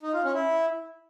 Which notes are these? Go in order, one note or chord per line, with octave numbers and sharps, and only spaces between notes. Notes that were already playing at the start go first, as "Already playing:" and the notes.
D#4
F4
C#4
E4